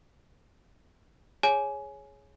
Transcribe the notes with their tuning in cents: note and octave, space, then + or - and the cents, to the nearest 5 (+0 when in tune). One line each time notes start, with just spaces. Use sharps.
G#4 +0 C#5 +0 G#5 +15